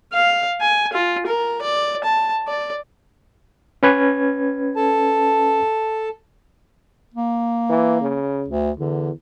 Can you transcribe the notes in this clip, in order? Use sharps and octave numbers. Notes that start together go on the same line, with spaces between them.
F5
G#5
F4
A#4
D5
A5
D5
C#4 B4 G#6
A4 A5
A#3
E3
C#3
D2
E2 D3